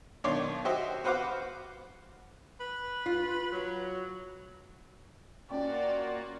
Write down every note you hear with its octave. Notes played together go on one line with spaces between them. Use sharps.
B1 D#3 D4 C#5 C6 D6
F#4 G4 C5 D#5 E5
F#4 B4 C5 F5 F#5 D6
B4
F4
F#3
A#3 C#4 F4 F#4 D5 G5